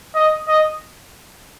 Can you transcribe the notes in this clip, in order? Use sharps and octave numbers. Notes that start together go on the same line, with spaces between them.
D#5
D#5